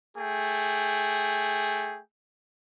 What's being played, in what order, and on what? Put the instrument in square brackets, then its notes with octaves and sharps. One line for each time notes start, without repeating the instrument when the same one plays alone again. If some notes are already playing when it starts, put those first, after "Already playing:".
[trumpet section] A3 G#4 G5